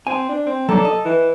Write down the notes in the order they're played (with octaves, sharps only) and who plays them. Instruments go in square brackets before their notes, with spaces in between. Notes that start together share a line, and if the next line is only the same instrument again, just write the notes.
[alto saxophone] C4 [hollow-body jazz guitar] G#5
[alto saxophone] D4
C4
[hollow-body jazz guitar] F#3 A#3 D4 [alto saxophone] A4
[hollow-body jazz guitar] D#5
[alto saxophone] E3